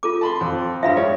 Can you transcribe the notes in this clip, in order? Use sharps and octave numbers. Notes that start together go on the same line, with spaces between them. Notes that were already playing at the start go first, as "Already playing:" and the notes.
F4 A4 D6
A5 B5 C6
F2
G2 F3 E5 F5 B5
G#3 C#5 D5